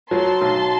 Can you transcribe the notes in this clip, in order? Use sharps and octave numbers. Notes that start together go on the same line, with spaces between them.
F#3 A5 C6
B1